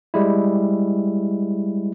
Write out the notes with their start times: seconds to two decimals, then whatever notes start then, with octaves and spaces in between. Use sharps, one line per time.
0.14 G3 G#3 E4